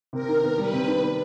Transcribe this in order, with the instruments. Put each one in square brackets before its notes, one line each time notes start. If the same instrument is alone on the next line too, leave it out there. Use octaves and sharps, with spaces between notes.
[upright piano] C3 [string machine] A#4
[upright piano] D#3
B3
[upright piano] G3 [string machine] B4
[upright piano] C3
D#3
B3